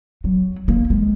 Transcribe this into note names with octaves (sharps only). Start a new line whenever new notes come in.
F#3
A#3
G#3